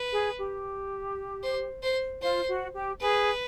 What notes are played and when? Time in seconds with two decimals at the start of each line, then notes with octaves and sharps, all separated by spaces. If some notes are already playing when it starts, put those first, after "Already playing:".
Already playing: B4
0.12 G#4
0.37 G4
1.43 C5
1.83 C5
2.22 F4 C5
2.48 F#4
2.74 G4
3.00 G#4 B4